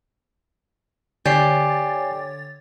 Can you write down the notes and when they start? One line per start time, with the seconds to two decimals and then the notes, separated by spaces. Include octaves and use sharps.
1.26 D3 G4 C#5 D5 G#5 A6 C7